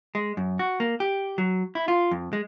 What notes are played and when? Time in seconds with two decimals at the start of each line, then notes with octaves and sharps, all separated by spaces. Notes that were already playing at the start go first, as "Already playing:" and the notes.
0.15 G#3
0.37 F#2
0.59 F#4
0.80 A#3
1.00 G4
1.38 F#3
1.75 E4
1.88 F4
2.11 F2
2.33 G#3